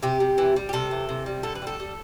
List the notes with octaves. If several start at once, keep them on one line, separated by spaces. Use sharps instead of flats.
C3 G4
C3
E3
G3
G4
C3 A4
E3
C3
G3
D3 A4
B4
G3
A4
G3